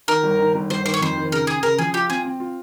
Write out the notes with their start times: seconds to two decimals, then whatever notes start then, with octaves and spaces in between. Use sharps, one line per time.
0.08 D#3 A#4
0.23 G1
0.40 D#3
0.54 G1
0.70 G1 C5
0.85 D#3 C5
0.94 C#5
1.01 F2 C5
1.17 D#3
1.32 C#3 A#4
1.47 C#3 G#4
1.63 C#3 A#4
1.78 F3 G#4
1.94 F4 G4
2.10 C4 G#4
2.25 C4
2.40 F4